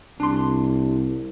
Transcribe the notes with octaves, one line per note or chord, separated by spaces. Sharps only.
C2 D4 C6